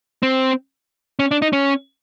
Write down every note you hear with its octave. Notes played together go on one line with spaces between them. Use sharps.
C4
C#4
D4
D#4
C#4